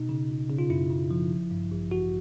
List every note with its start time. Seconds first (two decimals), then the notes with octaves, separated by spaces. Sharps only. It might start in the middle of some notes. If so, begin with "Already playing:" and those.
Already playing: B2 D#4
0.09 C#3
0.29 G1
0.50 C#3
0.59 F4
0.70 F#2 E4
0.90 C#3
1.11 F3
1.32 A1
1.51 G2
1.72 A1
1.91 A1 F#4